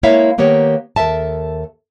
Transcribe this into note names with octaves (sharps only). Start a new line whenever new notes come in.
G#3 A#3 E4 C#5 E5 F5
D#3 A#3 B3 G4 C#5
D#2 A4 A#4 E5 A5